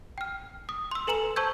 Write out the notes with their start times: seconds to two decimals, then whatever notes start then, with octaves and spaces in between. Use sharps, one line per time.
0.18 G5 F6
0.69 D#6
0.91 C6 E6
1.07 A4 B4 G#5 A#5 E7 F#7
1.36 C5 A5 C#6 E6 G6 G#6